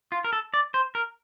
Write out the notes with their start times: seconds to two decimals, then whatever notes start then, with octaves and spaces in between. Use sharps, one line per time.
0.12 F4
0.24 A#4
0.33 A4
0.54 D5
0.74 C5
0.95 A#4